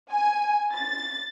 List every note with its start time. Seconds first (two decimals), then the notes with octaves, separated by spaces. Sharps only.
0.11 G#5
0.75 A6